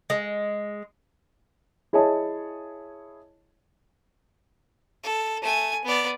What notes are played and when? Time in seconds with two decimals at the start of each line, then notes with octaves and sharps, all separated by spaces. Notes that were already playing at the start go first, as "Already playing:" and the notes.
0.10 G#3
1.93 E4 G#4 C#5 D#5 A5
5.04 A4
5.42 A3 G#5
5.84 B3 D5